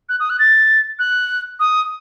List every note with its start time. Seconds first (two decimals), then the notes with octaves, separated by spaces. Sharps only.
0.09 F#6
0.20 D#6
0.30 F#6
0.39 A6
0.99 F#6
1.60 D#6